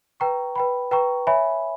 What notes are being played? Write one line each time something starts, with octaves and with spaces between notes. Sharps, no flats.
B4 G5 A#5 C#6
B4 G5 B5
B4 G5 A#5 C#6
C#5 E5 G#5 B5